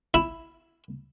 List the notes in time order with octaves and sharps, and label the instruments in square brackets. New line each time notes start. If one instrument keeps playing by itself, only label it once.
[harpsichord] E4